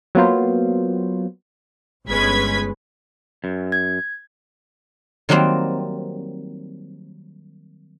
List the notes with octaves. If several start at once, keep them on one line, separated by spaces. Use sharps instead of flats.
F#3 A#3 B3 F4 C5
G1 G#3 C#4 B4 G#6 B6
F#2
G#6
D#3 F#3 G3 A#3 C4